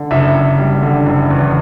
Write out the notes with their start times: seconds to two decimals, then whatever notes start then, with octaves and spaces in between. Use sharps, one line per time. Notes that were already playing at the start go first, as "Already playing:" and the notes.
Already playing: D3
0.11 F#1 E5
0.35 F#1
0.58 G3
0.82 D3
1.06 F#1
1.30 E2